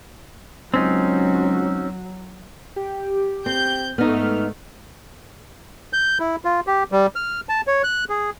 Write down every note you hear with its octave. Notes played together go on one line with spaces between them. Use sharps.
C#2 F#3 C4 C#4 D#4
G4
C4 G6
G#2 A3 B3 D#4 F6
G6
E4
F4
G4
G3
F6
A5
C#5
F#6
G#4